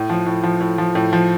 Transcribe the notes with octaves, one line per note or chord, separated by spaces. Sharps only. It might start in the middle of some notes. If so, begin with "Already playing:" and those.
Already playing: A2
F3
A2
F3
A2
F3
A2
F3